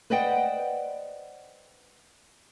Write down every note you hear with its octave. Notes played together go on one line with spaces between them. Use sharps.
B4 C5 D5 D#5 F#5 G5